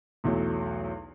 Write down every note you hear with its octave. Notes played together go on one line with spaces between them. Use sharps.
B1 E2 F#3 A3